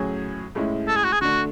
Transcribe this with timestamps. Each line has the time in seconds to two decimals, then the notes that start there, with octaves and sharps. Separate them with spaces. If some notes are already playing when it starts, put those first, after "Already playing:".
Already playing: A2 F#3 C#4 G#4
0.55 A2 G#3 C#4 E4
0.88 A4
0.96 G#4
1.04 F#4
1.12 G#4
1.21 D3 A3 D4 F#4